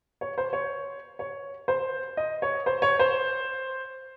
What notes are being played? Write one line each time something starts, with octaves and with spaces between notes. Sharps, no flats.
C#5
C5
C#5
C#5
C5
D#5
C#5
C5
C#5
C5